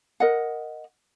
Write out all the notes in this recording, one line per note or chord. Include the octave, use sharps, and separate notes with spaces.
A#4 D#5 F#5